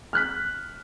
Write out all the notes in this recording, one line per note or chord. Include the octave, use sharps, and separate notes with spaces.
F6 F#6 B6